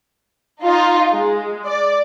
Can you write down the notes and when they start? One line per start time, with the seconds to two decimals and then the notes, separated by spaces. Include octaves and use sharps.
0.63 D#4 F4
1.11 G#3
1.66 D5